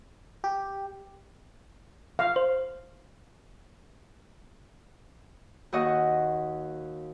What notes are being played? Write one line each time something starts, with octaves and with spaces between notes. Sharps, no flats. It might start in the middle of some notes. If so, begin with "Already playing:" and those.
G4
F5
C5
D#2 F#4 D#5 F#5 D#6